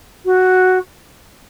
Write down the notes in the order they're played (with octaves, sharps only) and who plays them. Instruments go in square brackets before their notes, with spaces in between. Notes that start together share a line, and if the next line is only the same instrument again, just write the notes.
[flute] F#4